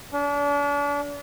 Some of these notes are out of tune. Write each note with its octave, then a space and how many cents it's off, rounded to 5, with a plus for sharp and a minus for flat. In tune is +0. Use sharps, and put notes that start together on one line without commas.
D4 -40